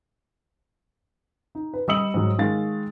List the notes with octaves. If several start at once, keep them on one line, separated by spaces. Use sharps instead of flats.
D#4
B4
G3 D#5 D#6 E6 C#7 F#7
G#2 F#3
D#3 G#3 F5 A6